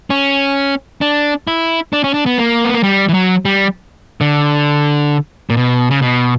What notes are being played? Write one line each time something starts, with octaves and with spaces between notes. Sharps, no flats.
C#4
D4
E4
D4
C#4
D4
B3
A#3
B3
A#3
G3
E3
F#3
G3
D3
A#2
B2
C#3
B2